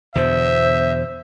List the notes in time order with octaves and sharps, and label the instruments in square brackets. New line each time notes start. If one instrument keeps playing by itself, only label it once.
[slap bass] E2 B2 D3 [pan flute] C5 [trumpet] E5